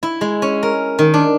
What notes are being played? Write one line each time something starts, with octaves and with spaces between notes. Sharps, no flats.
E4
G#3
C#4
A#4
D#3
D4